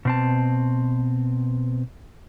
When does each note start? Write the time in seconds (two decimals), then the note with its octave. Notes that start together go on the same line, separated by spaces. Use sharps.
0.05 B2 C4 A5